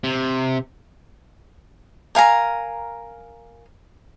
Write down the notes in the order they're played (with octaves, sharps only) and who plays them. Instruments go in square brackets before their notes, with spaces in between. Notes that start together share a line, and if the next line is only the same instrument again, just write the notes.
[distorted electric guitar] C3
[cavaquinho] A#4 F5 G#5 A#5